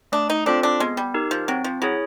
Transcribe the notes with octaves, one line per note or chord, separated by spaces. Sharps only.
A3 D4
D#4
C4 D4 F4 A4 C5
D4
G#3 B3
G3
D#4 G4 A#4
F3
F#3 C4
F3
F#3 E4 G#4 C#5